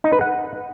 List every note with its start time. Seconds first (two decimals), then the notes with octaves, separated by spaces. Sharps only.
0.04 D#4
0.13 B4
0.21 F#5